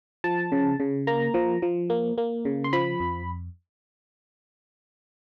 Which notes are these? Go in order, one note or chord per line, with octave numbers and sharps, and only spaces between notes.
F3 A5
C#3
C#3
A#3 A#5
F3
F3
A#3
A#3
C#3
C6
F3 B5
F2